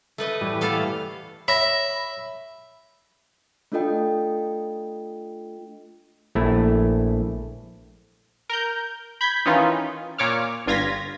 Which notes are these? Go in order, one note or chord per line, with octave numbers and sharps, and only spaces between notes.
A3 B4 D#5
A2 E3 G3
B3 A4 F5
C#5 E5 B5 A#6
A3 D4 F4 A4 D#5 G5
A#1 A3 E4
A#4 G6
B5 G6 G#6 B6
D#3 E3 C#4 D#4 F4
A#2 C#5 D6 F6
G1 G2 F4 G#6 A#6 B6